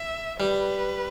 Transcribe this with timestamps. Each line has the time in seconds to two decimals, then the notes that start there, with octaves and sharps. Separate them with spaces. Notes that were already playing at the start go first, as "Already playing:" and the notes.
Already playing: E5
0.40 G3 B4